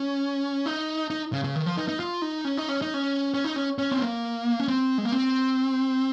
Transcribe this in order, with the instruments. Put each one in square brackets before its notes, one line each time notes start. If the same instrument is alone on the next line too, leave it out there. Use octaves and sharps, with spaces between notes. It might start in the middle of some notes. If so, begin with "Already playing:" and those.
Already playing: [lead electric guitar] C#4
D#4
D#4
C#3
C#3
D#3
F3
D#4
D#4
F4
D#4
C#4
D#4
C#4
D#4
C#4
C#4
D#4
C#4
C#4
C4
A#3
C#4
C4
G#3
A#3
C4